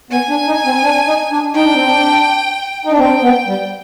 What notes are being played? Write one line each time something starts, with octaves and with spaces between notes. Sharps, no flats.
B3 G#5
D4
D#4
C4
D4
D#4
D4
D#4 G5
D4
C4
D4
D#4
D4
C4 G5
B3
G3